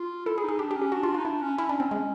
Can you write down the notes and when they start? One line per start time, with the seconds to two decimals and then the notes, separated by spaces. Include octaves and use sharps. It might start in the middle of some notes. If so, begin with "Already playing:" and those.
Already playing: F4
0.26 E4 A4
0.38 G#4
0.43 D#4
0.49 G#4
0.59 D4 G4
0.71 G4
0.75 C#4
0.82 G4
0.92 D4 F#4
1.03 F4
1.14 F4
1.17 D#4
1.25 D4 E4
1.42 C#4
1.58 C#4 E4
1.69 D4
1.80 C4
1.91 G#3